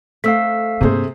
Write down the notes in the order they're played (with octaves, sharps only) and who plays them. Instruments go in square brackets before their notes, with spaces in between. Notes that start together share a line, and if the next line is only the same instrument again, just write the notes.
[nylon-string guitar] A3 C4 [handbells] F5 E6 B6
[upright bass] G2 A#3 [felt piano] C3 G#4 C5